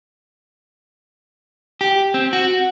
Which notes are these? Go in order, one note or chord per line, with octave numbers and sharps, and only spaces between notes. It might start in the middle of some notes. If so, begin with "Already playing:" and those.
G4
C4
F#4